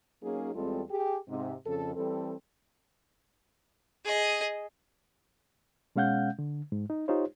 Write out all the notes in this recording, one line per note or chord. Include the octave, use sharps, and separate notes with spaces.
F#3 A#3 C#4 D#4 G#4
E2 G3 G#3 C4 F4 A4
G4 G#4
G#2 C3 G#3
F2 C#3 A4
E3 G3 C4 A4
G#4 D#5
B2 G#3 C#4 F5 F#5 G6
D3
G#2
D#4
D#4 F4 G4 C5 C#5